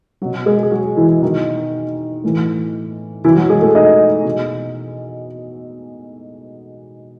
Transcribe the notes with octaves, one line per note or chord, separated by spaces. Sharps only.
F#3 F#4
B2
G#3 G#4
G#4
F#3 F#4
E3 E4
B2 D#3 F#3 D#4
A2 E3
B2 E3 F#3 E4
F#3 F#4
G#3 G#4
A3 A4
D#4 D#5
B2